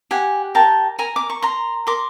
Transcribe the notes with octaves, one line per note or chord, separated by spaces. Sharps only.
G4 F#5 G#5
A#4 G5 A5
A#4 G#5 A#5
D6
C#6
A#4 A#5 C6
A#4 C6 D6